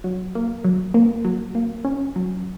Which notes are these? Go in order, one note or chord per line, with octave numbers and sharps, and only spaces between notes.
F#3
A#3
F#3
A#3
F#3
A#3
C#4
F#3